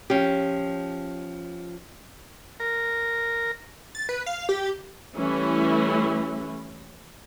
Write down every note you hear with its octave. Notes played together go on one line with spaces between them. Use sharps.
F3 C#4 G4
A#4
A6
B4
F5
G4
E3 G3 A3 C#4 E4